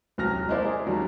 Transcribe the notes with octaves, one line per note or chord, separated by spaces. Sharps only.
D#1 C2 F#3 F6 A#6
G#3 A#3 E4 C5 D5
G#4
D#2 F#3 G3